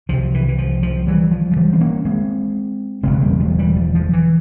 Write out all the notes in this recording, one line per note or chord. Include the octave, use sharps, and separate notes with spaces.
C2 C3 F3
E3
E3
F3
F3
E3 G3
F3
F3
E3 G3
C4
A#3 C#4
G#3 C4
E1 E2 C#3 G#3 C4
G3 A#3
F3 G#3
E3 G3
F3
F3
E3